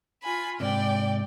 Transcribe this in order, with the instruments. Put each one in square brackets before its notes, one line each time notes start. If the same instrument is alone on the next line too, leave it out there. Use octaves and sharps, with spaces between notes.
[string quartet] F4 G#5 B5
[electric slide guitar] G#2 C3 [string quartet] D5 G5